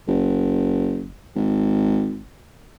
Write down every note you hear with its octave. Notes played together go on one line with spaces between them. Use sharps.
F#1
G#1